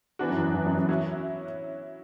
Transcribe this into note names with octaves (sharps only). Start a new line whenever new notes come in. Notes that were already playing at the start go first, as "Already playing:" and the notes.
E3 B3 D4 F#4
F#2
E2
E2
F#2
F#2
F#3 C#4 E4